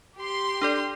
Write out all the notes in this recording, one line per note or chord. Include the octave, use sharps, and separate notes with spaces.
G4 C6
D4 A4 D5